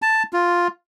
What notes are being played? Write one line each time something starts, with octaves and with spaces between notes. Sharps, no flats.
A5
F4